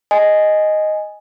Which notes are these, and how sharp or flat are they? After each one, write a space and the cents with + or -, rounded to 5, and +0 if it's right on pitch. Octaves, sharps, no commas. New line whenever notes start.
D#5 +0 G#5 +0